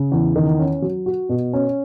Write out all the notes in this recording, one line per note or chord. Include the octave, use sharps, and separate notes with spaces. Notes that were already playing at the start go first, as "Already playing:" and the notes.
Already playing: C#3
E2
D#3
C#4
F#3
F#4
B2
C#4